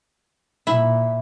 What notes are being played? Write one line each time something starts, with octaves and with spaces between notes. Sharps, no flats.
A#2 E4